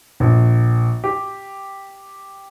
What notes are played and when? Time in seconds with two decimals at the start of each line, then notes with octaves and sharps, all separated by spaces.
0.20 A#1
1.04 G4